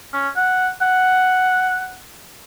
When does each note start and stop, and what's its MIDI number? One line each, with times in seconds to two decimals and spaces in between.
0.13 0.29 61
0.37 0.69 78
0.81 1.95 78